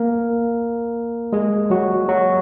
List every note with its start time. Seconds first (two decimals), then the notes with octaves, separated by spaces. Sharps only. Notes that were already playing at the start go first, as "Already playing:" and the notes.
Already playing: A#3 A#4
1.33 G#3 G#4
1.70 F#3 F#4
2.08 F#3 F#4